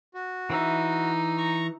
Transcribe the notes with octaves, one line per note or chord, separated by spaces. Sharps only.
F#4
E3 D#4 E5
A#5 C#6